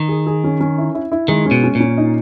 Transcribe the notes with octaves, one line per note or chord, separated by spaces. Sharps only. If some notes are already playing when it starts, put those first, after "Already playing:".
Already playing: D#3
G#4
G#4
C#4
C#4
E4
E4
E4
D#3 G#3
C#4
B2
C#4
A#2
C#4
D#4